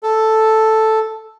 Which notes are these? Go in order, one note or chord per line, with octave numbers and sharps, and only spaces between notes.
A4